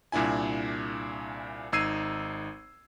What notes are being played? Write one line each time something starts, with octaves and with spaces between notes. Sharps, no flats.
C2 A#2 D4 E4 G#5
G#1 D#4 E6 G#6 C7 D#7